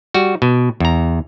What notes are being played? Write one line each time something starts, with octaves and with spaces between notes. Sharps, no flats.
G3 F#4
B2
E2 A#5